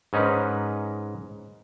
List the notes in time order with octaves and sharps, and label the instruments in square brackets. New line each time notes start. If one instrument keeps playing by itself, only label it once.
[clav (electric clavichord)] G#2 C#4 D#4 A#4 B4